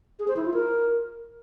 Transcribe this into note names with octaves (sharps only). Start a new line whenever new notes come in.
G#4
C5
E4
F4
A#4